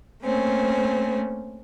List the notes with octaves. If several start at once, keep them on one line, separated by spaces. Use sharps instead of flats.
A3 A#3 C4 C#4